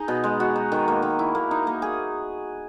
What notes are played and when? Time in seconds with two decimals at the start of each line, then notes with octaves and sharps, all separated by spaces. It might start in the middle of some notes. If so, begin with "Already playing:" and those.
Already playing: D#4 G#4
0.08 B2
0.24 G#3
0.40 F#4
0.56 D#4
0.72 D#3
0.88 A#3
1.02 D#3
1.19 E4
1.35 A#3
1.51 D#4
1.67 A#3
1.82 G#4